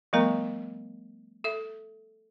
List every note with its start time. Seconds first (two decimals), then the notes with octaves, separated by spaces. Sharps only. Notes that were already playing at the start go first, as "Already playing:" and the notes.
0.13 F3 G3 A3 B3 A#4 A#5
1.44 A4 E5